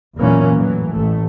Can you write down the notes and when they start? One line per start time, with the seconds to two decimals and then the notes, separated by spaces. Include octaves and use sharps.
0.18 F#1 E2 A#2 E3 A#3 C#4
0.56 A2 E3 F#3
0.95 A1 A3